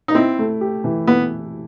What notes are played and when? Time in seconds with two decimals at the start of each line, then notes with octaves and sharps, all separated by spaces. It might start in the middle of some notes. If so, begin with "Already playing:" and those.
0.08 D#4
0.15 C4 E4
0.39 A3
0.61 G4
0.84 E3
1.07 B3 E4